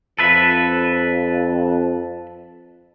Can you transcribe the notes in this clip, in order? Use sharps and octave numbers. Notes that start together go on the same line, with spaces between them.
F2 A4 B4 E5